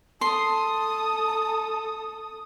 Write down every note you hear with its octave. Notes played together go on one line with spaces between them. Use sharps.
A4 A5 C6 D#6